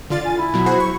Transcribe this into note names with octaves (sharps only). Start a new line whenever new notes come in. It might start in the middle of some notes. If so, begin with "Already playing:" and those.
D3 F4 D5 A6
G#5
E4
B2 F#3
F#4 G#4 C5
C#6